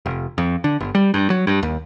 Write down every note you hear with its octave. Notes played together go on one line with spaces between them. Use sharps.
F1
F2
D3
G1
G3
G2
F#3
G2
D#2